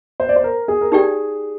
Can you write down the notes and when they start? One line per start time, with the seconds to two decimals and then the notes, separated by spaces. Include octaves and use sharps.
0.20 C5
0.29 D5
0.36 C5
0.44 A#4
0.68 G#4
0.81 A#4
0.92 D#4 G4 G#4 D5 G5